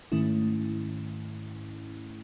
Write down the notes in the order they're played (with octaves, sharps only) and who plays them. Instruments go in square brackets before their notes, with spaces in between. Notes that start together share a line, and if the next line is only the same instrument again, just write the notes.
[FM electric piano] G#2 D#3 A3 C#4 E4